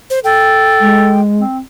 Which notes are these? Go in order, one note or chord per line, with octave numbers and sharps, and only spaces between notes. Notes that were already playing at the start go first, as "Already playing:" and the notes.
C5
A4 G5
G#3
C4